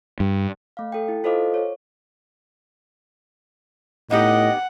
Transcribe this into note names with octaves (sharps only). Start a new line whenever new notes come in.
G2
A3 F5
A4 G5
E4
F4 A4 C5 D#5 F5 D6
C#5
A2 B3 D#4 G4 D#5 F#5